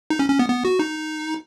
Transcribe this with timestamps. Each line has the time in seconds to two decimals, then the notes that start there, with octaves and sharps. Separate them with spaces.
0.10 D#4
0.19 C#4
0.30 C#4
0.39 B3
0.49 B3
0.65 F#4
0.79 D#4